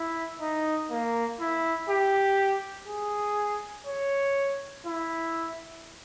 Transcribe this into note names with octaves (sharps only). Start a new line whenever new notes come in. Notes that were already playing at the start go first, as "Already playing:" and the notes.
Already playing: E4
D#4
A#3
E4
G4
G#4
C#5
E4